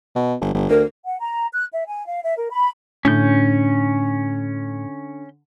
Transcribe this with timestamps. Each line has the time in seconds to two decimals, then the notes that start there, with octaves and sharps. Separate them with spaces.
0.16 B2
0.41 G1
0.54 G1
0.70 D2 A#4
1.05 F#5
1.19 A#5
1.52 F#6
1.72 E5
1.86 G#5
2.06 F5
2.23 E5
2.37 A#4
2.51 B5
3.05 A2 D3 C#4 G6